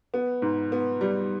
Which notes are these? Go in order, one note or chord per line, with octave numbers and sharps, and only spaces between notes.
B3
G#2
B3
G3